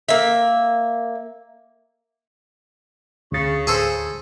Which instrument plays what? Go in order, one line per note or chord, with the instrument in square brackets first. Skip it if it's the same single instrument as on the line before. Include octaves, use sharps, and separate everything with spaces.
[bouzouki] A#3 E5
[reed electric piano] D2 A6 [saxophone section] C#3
[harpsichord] G#4 A4 C5